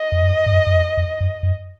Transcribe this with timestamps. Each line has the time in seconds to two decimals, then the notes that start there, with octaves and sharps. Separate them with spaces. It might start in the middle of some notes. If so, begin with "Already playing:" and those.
Already playing: D#5
0.12 F2
0.23 F#2
0.46 G#2
0.52 F#2
0.67 F#2
0.75 F2
0.97 F2
1.21 F#2
1.43 F#2